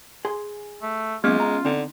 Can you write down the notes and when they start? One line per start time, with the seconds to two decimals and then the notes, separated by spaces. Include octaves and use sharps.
0.25 G#4 C6
0.82 A3
1.24 F#3 G#3 A#3 B3 C#4 F4 F6
1.40 A#5
1.65 D3 C4 D#4